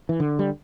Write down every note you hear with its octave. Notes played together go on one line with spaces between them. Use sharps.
E3
D3
G3